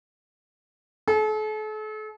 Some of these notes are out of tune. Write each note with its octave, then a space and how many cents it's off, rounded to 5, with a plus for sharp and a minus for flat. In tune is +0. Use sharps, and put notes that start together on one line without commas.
A4 -40